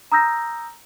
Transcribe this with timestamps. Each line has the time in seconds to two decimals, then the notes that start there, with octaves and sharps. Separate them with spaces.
0.12 A#5 D#6 E6 G6 A#6